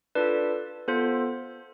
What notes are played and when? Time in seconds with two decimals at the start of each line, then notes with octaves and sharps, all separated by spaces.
0.15 D4 F4 A4 B4 D5
0.88 B3 F4 A4 C5